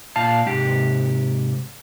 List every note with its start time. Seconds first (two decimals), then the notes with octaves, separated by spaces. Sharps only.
0.16 A#2 F5 A5
0.46 G#2 C3 G4